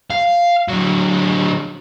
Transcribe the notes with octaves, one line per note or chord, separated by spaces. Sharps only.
F5
D3 F#3